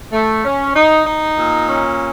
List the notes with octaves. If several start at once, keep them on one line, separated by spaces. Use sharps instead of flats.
A3
C#4
D#4
D#4
A#2
C#4